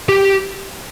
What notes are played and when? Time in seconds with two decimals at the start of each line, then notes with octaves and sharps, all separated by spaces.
0.09 G4